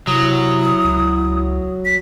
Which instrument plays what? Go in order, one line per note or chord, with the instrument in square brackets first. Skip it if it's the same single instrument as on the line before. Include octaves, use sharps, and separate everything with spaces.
[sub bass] C3 [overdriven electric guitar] F#3 [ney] E4 [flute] D#6
[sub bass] C#2
[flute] B6